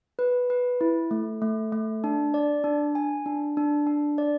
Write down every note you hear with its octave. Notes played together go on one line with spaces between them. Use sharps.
B4
B4
E4
A3
A3
A3
D4
D5
D4
G#5
D4
D4
D4
D5